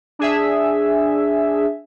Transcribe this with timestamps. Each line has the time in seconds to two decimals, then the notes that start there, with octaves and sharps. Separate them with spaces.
0.19 D4 G#4 E5